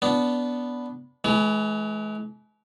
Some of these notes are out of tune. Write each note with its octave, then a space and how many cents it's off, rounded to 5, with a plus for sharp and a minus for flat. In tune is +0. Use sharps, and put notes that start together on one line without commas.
B3 +0 D4 -20
E3 +0 G#3 +45